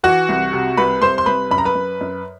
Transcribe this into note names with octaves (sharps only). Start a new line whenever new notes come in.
E3 F#4 F#5
C2
C3
C2 B4 B5
C2 C5 C6
C6
C2 B4 B5
F#2 B5
A#5
B4 B5
F#2
F#2